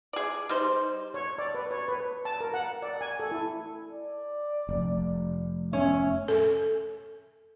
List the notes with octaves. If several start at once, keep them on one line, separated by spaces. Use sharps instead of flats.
G#4 D5
G3 D#4 C5
C#5
D5
B4
C#5
B4
A5
A#4
F#5
D5
G#5
A4
E4
D5
F1
C#4 E5
A4